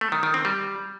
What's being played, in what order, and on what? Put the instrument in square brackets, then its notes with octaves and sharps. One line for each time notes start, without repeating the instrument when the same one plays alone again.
[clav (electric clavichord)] A3
D#3
D#3
C4
G3